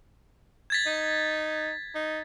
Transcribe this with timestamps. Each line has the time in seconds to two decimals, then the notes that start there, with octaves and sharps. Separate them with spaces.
0.70 G#6 A6 B6
0.87 D#4
1.95 D#4